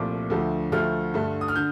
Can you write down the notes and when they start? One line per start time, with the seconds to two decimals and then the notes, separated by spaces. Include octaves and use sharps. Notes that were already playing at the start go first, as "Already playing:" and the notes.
Already playing: C2 A#2 F3 A3 D6
0.30 D2 D3 F3 A3
0.72 D2 D3 F3 A3 F6
1.14 G2 D3 A3
1.41 D#6
1.48 F6
1.56 D3 G6